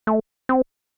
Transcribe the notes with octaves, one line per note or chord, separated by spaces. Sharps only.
A3
C4